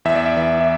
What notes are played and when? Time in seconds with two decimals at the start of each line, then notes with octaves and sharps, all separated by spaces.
0.05 E2 E5
0.15 D5
0.26 E5
0.37 E3
0.61 E5